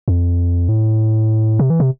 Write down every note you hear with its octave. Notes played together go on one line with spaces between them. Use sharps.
F2
A2
C3
E3
C3